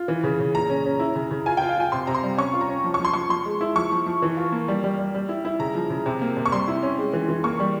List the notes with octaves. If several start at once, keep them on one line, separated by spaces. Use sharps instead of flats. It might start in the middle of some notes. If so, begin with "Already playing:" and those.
Already playing: F4
E3
C#3
C#3
A#2 A#5
C#4
C#4
E4
C#3
C#3
F4 G#5
G5
F4
F5
F4 G#5
C3 C6
C3 A#5
C6
G3
C#4 C#6
F4
A#5
C#4
F3
C#6
F3
C6
F3 C#6
F3 C6
G#3
E4
F3 C#6
F3
F3
E3
F4
A#3
G3
G3
G3
G3
E4
E4
C#3 A#5
F3
C#3
C3
A#3
C3
C#6
G3 C6
E4
C#4
G#3
E3
E3
A#3 C#6
G3